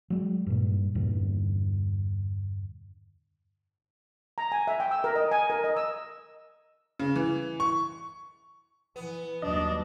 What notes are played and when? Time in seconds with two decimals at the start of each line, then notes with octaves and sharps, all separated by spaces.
0.10 F#3 G#3
0.46 G2 A#2
0.95 E2 G2 A#2 D3
4.38 A#5
4.52 G#5
4.67 E5
4.80 G5
4.91 E6
5.04 A#4
5.15 D#5
5.31 G#5
5.50 A#4
5.64 D#5
5.77 E6
6.99 C#3
7.16 E3
7.60 C#6
8.96 E3 B3
9.42 D#2 F#3 G3 D4 D#5